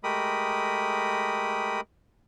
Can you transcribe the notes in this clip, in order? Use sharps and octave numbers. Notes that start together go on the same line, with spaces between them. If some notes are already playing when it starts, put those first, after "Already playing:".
G#3 A3 G4 A#4 B5 D#6